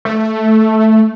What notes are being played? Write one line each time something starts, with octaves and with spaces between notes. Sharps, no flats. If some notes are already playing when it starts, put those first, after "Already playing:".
A3